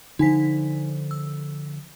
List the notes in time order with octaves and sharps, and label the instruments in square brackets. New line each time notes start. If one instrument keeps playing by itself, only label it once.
[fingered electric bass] D3 F3 [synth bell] D#4 G#5 B6
[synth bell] E6